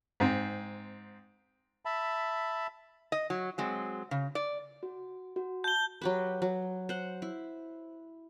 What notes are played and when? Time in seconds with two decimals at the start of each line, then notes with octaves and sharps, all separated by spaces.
0.20 G#2 C4
1.85 E5 A5 B5
3.12 D#5
3.30 F#3
3.58 F#3 G#3 C4
4.11 C#3
4.35 D5
4.83 F#4
5.36 F#4
5.64 A5 G6 G7
6.02 F#3 G4 B4
6.42 F#3
6.89 C5 F#5
7.22 E4